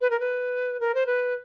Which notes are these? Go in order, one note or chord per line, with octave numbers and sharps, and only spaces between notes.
B4
A#4
B4
A#4
C5
B4